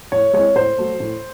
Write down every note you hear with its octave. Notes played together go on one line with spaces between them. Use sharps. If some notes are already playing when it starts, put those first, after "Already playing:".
A2 C#5
G#3 C4 E4 C#5
A2 C5
F#3 A3
A2